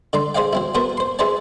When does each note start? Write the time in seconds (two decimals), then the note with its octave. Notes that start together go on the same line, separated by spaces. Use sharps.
0.13 D3 D5 A#5 C6
0.35 G#4 C5 D5 D#5 F5 G5
0.53 F#3 C4 E4
0.75 B3 F#4 A#4 C5 A5 A#5
0.97 C5 C6
1.19 E4 G#4 B4 C5 D5 A5